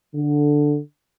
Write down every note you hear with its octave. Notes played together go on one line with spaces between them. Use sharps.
D3